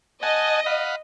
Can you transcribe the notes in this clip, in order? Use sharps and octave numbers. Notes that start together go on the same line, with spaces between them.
D#5 F#5 G#5 A5
F5 F#5 B5